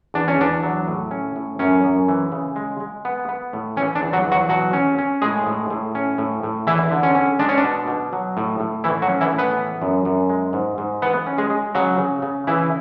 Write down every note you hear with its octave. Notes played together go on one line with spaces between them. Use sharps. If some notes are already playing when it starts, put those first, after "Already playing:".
E2 D4
C#4
E2 D4
F#3
A2
C#4
A2
F#2 C#4
F#2
E3
C#3
G#3
G#3
B3
B3
A2
E3 C#4
D4
E2
F#3 F#4
E2
F#3 F#4
B2 F#3 F#4
C#4
C#4
A2 G#3 G#4
A2
A2
C#4
A2
A2
E2 E3 E4
D3
C#4
C#4
G#3 D4
C#4
D4
B2
B2
F#3
A2
A2
E3 A3 E4
F#3 F#4
C#4
E3 E4
A2
B3 B4
E3
F#2
F#2
G#3
G#2
G#2
E3 B3 B4
C#4
G#3 G#4
G#3
C#3 F#3 F#4
C#3
C#3
C#3 E3 E4